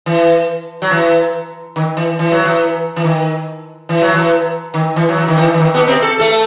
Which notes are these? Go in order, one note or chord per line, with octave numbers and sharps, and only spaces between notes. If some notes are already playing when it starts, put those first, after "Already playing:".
E3
F#3
E3
D#3
E3
E3
F#3
E3
E3
D#3
E3
F#3
E3
D#3
E3
F#3
E3
D#3
E3
E3
D#3
B2 B3
C3 C4
A4
A3 A4